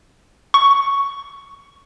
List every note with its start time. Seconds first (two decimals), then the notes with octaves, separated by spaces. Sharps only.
0.54 C#6